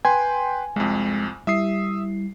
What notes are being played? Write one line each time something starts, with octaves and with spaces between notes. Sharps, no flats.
B4 G5 G#5 C6
C2 F2 G#3
G3 E4 E5 D#6 C7